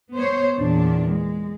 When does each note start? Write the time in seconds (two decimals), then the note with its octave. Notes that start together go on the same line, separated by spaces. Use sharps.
0.13 B3 C5 C#5
0.56 E2 A#2 D4
1.08 G#3